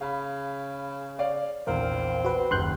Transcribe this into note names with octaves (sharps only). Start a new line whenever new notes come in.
C#3 F5 B5
C#5 D5 F5
A#1 E2 C4 A#4 F5
F#4 B4
F#1 D#2 C6 F#6 G6